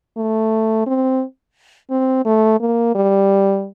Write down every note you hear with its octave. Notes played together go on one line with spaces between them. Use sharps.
A3
C4
C4
A3
A#3
G3